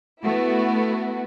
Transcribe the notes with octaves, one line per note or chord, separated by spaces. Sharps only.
A3 B3 E4 F#4